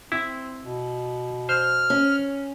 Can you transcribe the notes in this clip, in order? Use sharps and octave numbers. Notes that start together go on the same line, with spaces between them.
C4 E4
B2
C5 F6
C#4